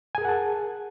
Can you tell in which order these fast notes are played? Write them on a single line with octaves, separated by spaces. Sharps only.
G#5 G#4 A#4 F#5 A5